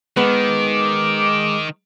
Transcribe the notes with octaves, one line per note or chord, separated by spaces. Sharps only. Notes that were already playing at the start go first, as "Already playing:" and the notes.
D#3 G#3 B3 D6